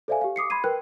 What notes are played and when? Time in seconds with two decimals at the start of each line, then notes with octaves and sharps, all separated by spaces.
0.08 A4 C5 D5 E5 F5 G#5
0.21 G4 F5
0.36 D6 D#6 C7 C#7
0.50 B5 C6 G#6 C7 D#7
0.64 A#4 B4 G5 F#6